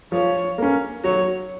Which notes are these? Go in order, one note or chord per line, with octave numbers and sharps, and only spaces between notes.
F3 C#5
A#3 C#4
F#3 C#5